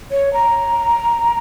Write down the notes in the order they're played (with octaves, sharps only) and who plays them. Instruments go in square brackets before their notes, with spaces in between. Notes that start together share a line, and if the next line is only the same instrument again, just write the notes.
[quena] C#5
A#5